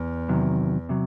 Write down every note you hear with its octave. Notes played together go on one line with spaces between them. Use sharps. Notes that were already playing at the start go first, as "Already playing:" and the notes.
Already playing: E2
C3 D#3 F#3
C3 F#3